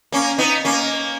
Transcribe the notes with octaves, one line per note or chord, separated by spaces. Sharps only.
A#3 C#4
B3 D#4
A#3 C#4